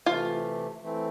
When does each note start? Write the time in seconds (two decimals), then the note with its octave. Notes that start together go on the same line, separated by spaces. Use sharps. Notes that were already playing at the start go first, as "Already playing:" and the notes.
0.06 C3 E3 A3 F4
0.82 E3 A3 C4 E4